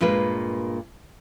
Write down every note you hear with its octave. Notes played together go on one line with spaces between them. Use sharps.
G2 A#2 G#3 B4